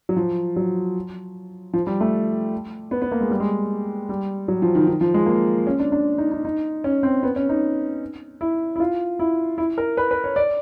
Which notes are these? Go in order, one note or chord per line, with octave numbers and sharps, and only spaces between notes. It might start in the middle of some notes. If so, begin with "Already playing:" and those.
F#3
F3
F#3
F3
G3
A3
B3
B3
A#3
G#3
G3
G#3
G3
F#3
F3
D#3
D#3
F3
G#3
A#3
C#4
D4
D4
D#4
D#4
D#4
C#4
C4
B3
C#4
D#4
E4
E4
F4
E4
E4
A#4
B4
B4
C#5
D5